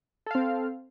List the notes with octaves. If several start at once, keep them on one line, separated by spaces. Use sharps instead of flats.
C4 A4 F5